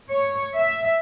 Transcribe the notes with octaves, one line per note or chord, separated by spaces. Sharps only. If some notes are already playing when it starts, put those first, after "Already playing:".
C#5
E5